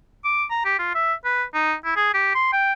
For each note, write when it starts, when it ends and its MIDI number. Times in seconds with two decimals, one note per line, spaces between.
0.25 0.44 86
0.50 0.63 82
0.65 0.78 67
0.79 0.90 65
0.94 1.13 76
1.25 1.43 71
1.54 1.74 63
1.84 1.95 64
1.96 2.10 68
2.14 2.31 67
2.35 2.48 84
2.52 2.73 79